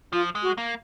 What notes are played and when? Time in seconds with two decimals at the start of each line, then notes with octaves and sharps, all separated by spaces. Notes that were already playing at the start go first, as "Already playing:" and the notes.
0.13 F3 F4
0.35 G#3
0.43 F#4
0.58 A#3